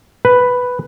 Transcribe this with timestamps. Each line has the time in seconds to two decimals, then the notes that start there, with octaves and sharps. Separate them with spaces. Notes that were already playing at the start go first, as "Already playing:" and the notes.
0.25 B4